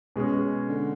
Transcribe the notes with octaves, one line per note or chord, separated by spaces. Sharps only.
B2 G#3 C#4
D3